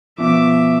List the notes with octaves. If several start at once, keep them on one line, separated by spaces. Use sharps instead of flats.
B2 F3 E5 D6